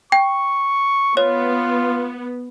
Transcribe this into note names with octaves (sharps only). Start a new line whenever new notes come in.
G5 C#6
B3 F4 C#5